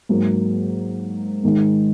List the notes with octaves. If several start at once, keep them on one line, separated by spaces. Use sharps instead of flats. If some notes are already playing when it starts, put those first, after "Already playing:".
G#2 F#3 A#3
G#2 D#3 G#3